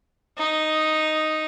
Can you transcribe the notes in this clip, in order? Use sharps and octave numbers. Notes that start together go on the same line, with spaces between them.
D#4